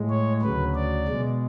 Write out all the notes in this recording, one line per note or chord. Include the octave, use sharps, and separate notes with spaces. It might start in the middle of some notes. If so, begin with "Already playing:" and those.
Already playing: A2 G#3
C#5
D2 C#3 F#3 B4
D5
B2 G#3